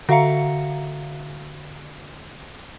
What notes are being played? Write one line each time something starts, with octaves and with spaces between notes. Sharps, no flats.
D3 F#4 E5 F5 A#5 C#7